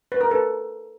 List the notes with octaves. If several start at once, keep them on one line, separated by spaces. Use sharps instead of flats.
B4
A#4
A4 B4